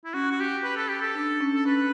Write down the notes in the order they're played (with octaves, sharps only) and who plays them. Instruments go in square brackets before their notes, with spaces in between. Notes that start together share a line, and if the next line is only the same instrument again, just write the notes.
[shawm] E4
[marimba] C#4 [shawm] F#4
[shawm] F#4
G4
B4
A4
G4
A4
[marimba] D4
C#4
[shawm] A4
[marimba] C#4 [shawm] B4